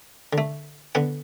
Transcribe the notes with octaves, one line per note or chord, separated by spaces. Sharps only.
D3
A3
D3 B3 F#5